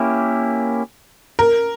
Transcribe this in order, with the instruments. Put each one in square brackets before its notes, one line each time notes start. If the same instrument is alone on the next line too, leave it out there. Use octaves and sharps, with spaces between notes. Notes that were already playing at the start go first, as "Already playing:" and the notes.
Already playing: [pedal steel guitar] A#3 C#4 E4 G4
[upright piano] A#4